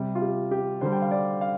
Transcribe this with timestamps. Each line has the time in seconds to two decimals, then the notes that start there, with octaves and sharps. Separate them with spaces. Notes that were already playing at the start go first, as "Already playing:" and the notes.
Already playing: C3 G3 G4
0.15 F4
0.22 G4
0.51 G4
0.81 D3 G3 C5
0.92 G5
1.02 F5
1.11 D5
1.41 F5